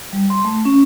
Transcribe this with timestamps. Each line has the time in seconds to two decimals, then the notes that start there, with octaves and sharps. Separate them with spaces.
0.13 G3
0.30 C6
0.45 A3
0.65 C#4